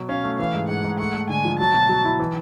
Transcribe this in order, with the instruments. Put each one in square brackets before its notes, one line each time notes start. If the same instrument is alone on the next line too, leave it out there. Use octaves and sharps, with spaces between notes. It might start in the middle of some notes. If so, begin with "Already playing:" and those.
Already playing: [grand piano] B2 F#3
[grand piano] C#4 [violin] F5
[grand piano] A3
[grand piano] E3 [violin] F5
[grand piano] G#2
[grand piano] G#2 [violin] F#5
[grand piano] G#2
[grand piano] A3 [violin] F#5
[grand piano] A3
[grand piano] D3 [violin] G#5
[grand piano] F3
[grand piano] F#3 [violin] A5
[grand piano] B2
F#3
E4
E3